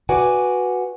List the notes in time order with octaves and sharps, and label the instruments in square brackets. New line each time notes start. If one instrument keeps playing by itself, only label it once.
[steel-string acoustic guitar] F#4 B4 D5 F#5 G#5